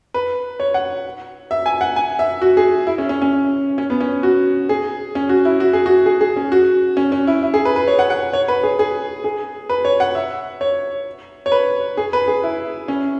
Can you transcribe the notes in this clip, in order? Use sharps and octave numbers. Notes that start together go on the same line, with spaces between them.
B4
C#5
F#5
E5
G#5
F#5
G#5
E5
F#4
G#4
E4
C#4
C#4
C#4
C#4
B3
C#4
F#4
G#4
C#4
F#4
E4
F#4
G#4
F#4
G#4
G#4
C#4
F#4
C#4
C#4
E4
E4
G#4
B4
B4
C#5
F#5
F#5
C#5
B4
G#4
G#4
G#4
B4
C#5
F#5
E5
C#5
C#5
B4
G#4
B4
G#4
E4
C#4